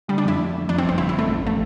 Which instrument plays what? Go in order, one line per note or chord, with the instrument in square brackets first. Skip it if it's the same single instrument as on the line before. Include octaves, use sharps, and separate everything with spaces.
[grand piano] D3 [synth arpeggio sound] G3
[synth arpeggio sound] D4
[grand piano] F2 [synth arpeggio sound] E4
[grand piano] A3
A3
[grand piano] F2 [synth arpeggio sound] D4
[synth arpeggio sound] C4
[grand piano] G1
[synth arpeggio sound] C4
[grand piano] D3 [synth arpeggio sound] E4
[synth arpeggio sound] E4
[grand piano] F2 [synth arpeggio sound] A3
[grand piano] A1
[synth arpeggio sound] A3